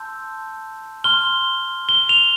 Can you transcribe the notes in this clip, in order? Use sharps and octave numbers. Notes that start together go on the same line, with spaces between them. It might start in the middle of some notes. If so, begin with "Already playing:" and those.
Already playing: A5 C6 E6 G6
C6 F6 G7
G7
F7